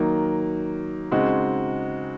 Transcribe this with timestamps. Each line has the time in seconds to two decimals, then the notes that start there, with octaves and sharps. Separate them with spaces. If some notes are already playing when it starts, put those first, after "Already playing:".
Already playing: D#3 F#3 A#3 D#4
1.11 C#3 G#3 C4 D#4 F#4